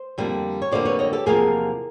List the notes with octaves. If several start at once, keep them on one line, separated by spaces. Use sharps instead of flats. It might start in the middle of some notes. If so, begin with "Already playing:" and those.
Already playing: C5
F2 D3 G3 A#3
C#5
F2 D3 G3 A#3 C5 D5
B4 C#5
C#5 D#5
G4 A4
E2 C3 F3 A#3 G#4 A#4